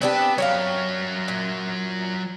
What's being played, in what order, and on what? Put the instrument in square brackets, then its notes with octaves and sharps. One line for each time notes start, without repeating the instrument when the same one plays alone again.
[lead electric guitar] B3 B4 [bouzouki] C4 D4 G4
[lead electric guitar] F#3 A#4 [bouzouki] C#5 E5 F5
[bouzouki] A#2